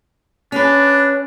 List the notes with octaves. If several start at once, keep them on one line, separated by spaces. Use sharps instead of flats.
C#4 D4 B4